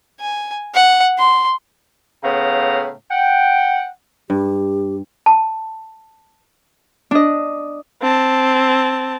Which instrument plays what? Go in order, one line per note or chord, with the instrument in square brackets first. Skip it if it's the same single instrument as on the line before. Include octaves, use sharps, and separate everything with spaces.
[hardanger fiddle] G#5
F#5
C6
[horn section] A2 C#3 B3 F5 G5 A#5
F#5 G5
[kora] G2 [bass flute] G4
[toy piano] A5
[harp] D4 D#5
[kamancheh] C4 A5